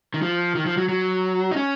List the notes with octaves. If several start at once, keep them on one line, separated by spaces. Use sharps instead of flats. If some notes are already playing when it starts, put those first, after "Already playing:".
D#3
F3
D#3
F3
F#3
F#3
D#4
C#4